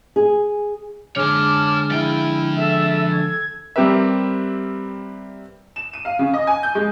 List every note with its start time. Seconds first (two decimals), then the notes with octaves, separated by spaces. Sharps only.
0.16 G#4
1.16 D3 G#3 G#4 C#5 A5 D6 F6
1.91 F3 E4 G5
2.57 A4 E5
3.12 G#6
3.76 G3 C4 G4 A#4 B4 E5
5.76 E7
5.93 D#7
6.05 F5
6.19 C#3
6.34 D#5
6.47 G#5
6.63 G6
6.75 G#3